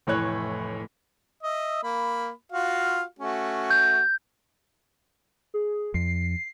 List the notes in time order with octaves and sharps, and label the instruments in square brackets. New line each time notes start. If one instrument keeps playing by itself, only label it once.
[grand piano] F1 A2 E3 A3 C#5 F#6
[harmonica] D#5 E5
A#3 B5
F4 F#4 F5
A3 C#4 F#4
[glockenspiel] G6
[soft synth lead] G#4
[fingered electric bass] F2 [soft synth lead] C7